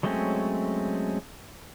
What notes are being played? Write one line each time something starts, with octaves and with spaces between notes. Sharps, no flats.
F#3 G#3 A3 C4 C#4